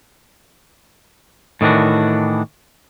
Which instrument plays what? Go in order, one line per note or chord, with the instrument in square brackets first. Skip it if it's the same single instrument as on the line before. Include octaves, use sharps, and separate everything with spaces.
[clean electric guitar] A2 D#3 E3 D4 F#4